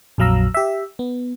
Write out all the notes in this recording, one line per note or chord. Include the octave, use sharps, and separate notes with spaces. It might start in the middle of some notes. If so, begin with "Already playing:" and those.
A#1 F2 F#3 F5 A#5 E6
G4 E5
B3